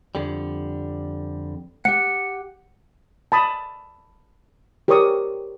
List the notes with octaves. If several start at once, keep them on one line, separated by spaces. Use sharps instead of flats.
F2 D3 G3
G4 F#5 C#7
A5 B5 D#6
G4 A#4 C5 C#5 C#6 D#6